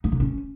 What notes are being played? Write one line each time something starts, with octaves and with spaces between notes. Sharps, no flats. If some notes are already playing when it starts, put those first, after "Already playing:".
D#4
D3
C#4